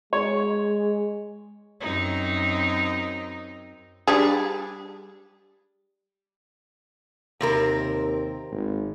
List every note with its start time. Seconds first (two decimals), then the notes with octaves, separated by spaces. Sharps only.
0.13 G#3 C#5
1.81 F#2 C4 D#4
4.07 G3 D4 G#4
7.41 D#2 C3 C4 A#4
8.51 G#1